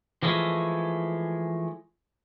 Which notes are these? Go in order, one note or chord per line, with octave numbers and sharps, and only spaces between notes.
E3 F3 G#3 A3